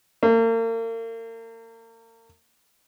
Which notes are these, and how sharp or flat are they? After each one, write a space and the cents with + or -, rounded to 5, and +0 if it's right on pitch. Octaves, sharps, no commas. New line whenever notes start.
A#3 -40